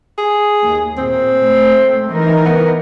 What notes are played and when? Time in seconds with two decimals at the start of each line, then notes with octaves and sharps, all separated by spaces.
0.18 G#4
0.64 D#2
0.98 A#2 C4
1.45 A3
2.09 E3 D#4 A#4
2.45 B3